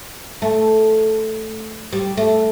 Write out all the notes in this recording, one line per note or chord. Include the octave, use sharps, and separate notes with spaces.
A3
G3
A3